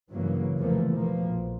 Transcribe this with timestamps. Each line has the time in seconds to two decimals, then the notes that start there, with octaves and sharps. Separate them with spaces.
0.10 G2 C#3 E3 F#3 A#3
0.56 E2 C3 E3 F3 A3 A#3
0.89 B2 F3 A#3
1.24 A#1